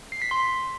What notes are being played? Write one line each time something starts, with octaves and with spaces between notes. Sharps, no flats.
C7
B6
C6